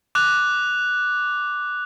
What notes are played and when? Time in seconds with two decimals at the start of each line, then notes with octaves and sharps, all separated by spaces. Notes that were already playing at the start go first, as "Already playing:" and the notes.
0.15 D6 F#6 F7